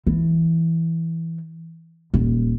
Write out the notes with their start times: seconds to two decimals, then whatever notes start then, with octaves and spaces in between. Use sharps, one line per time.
0.07 E3
2.14 D#1